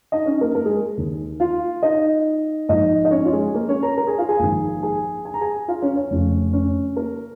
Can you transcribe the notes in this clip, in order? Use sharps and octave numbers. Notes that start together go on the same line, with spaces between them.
D#4 D#5
C#4 C#5
A#3 A#4
A#3 A#4
G#3 G#4
D#2 D#3
F4 F5
D#4 D#5
A#1 G#2 F3 D#4 D#5
D#5
C#4 C#5
F4
G#3 G#4
A#3 A#4
C#4 C#5
A#4 A#5
A#4 A#5
G#4 G#5
F4 F5
G#4 G#5
A#1 G#2 D#3
G#4 G#5
G#5
A#5
G#4 G#5
F4 F5
C#4 C#5
C#4 C#5
F1 F2 C#3
C#4 C#5
A#3 A#4